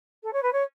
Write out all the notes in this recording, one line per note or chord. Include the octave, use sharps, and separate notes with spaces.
A4
C#5
B4
C#5